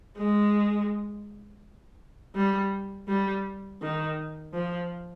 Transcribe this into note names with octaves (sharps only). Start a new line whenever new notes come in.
G#3
G3
G3
D#3
F3